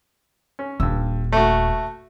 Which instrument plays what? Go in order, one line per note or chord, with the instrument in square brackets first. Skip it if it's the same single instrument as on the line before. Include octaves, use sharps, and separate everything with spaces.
[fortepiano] C#4
[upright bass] D#1 [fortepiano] G2 E6
[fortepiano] A3 F#4